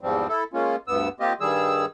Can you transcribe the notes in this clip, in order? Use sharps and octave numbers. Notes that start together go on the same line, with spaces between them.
E2 G#2 F3 G3 C4
E4 A4
G#3 A#3 C#4 F4
D2 G2 B3 E6
A#3 C4 F4 G4 D#5
G2 D#3 G3 G#4 E6